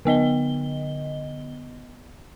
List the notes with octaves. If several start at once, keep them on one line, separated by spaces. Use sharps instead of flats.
D3 B3 D#5 G7